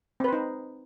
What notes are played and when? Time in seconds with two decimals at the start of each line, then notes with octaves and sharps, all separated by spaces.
0.20 C4
0.24 B4
0.28 C5
0.33 D#4